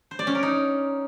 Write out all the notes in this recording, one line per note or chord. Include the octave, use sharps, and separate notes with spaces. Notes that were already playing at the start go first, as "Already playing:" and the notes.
C5
D5
C#4
A#4
D#4